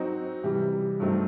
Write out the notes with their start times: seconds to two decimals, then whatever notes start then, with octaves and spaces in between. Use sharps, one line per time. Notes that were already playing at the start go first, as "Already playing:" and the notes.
Already playing: F#3 C4 D#4 F#4
0.44 C3 E3 G3
1.00 G2 F#3 A3 C4 D#4